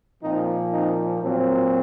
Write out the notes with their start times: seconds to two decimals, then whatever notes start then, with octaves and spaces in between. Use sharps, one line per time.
0.22 A#2 F3 A#3 C4 D#4
0.73 C4 D#4
1.23 A#2 F#3 C4